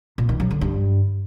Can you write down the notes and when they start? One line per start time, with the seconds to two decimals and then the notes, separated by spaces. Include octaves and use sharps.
0.18 A#2
0.29 D#3
0.40 F#3
0.51 D3
0.61 G2